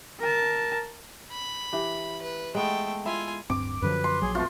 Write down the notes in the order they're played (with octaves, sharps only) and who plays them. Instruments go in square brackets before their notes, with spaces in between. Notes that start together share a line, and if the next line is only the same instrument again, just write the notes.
[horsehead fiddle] A#4 A5
[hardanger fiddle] B5
[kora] E3 G4
[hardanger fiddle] B4
[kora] G#3 B3 [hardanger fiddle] A3 G5
[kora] E4 E5 [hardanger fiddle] F4 G#5
[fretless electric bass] D1 G2 C4 [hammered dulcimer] D6
[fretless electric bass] F#2 D3 F3 [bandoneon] B4
[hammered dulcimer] C6
[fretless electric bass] A#1 F#3 [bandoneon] G#4
[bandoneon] F2 B2 A3 [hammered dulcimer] F4